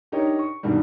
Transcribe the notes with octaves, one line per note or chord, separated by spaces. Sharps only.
D4 D#4 G4 A#4 C#5
C#6
G2 B2 D#3 G3